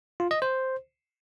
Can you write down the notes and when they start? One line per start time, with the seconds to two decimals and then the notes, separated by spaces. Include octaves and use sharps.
0.20 F4
0.31 D#5
0.42 C5